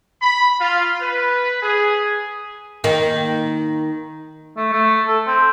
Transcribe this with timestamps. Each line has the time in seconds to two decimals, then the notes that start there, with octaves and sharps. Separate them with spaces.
0.22 B5
0.61 F4
1.01 B4
1.62 G#4
2.84 D#3 A#3
4.57 A3
4.72 A3
5.07 A4
5.27 C4